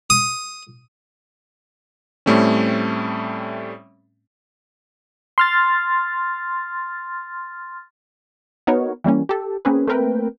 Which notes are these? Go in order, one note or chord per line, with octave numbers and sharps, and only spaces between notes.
D#6
A2 G3 A3 C4 C#4
C6 F6 A6
B3 D#4 F#4 A#4 C#5
E3 G3 A#3 C#4
G4 A4
A#3 C4 C#4 G#4 B4
A3 A#3 C4 A#4 B4 G5